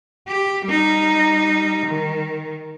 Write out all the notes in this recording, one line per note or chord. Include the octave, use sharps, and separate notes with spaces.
G4
G3 D#4
D#3